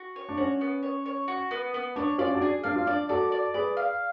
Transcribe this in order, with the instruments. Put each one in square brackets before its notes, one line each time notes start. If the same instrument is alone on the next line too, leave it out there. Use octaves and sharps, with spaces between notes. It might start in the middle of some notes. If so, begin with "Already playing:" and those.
Already playing: [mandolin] F#4
C#5
[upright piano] D4
[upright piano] C#4 [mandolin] F#4
[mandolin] B3
C#5
C#5
F#4
B3
B3
[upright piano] D4 [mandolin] C#5
[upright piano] C#4 F4 [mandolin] D5
[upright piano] D4 F#4
[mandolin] G#4
[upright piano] D4 [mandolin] F5
[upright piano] F4
[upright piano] D4 [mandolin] D5
[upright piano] F#4 A4 [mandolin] D5
[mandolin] D5
[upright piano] G#4 B4 [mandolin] D5
[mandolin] F5